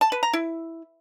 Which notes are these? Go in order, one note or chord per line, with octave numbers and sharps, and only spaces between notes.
A5
B4
A#5
E4